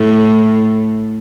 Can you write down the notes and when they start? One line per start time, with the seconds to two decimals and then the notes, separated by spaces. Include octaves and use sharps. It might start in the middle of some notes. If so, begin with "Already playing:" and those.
Already playing: A2